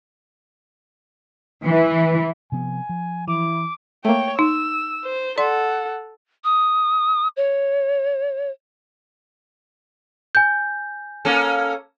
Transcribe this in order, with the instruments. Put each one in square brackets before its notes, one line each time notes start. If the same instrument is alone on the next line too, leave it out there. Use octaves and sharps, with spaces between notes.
[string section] E3
[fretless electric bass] C3 F3 B3 [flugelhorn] G#5
[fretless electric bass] F3
[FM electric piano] E3 [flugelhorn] E4 [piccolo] D6
[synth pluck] A3 A#3 [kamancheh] C#5 G5
[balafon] D#4 [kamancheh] E6
[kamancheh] C5
[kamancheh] A4 F#5 [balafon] D5 C6
[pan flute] D#6
C#5
[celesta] G#5 G6
[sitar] A#3 C#4 A4